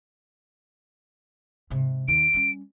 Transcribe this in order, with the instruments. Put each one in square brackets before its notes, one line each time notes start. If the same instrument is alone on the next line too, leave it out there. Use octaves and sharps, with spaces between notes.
[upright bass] G#2 C3
[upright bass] D#2 [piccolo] D7
[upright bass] G3 C#4